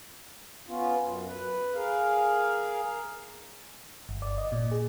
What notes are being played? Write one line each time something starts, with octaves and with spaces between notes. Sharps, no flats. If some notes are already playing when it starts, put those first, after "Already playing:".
B3 C#4 F4
F#2
B4
G#4 A#4 F5
G1
D5
D#5
A#2
G#4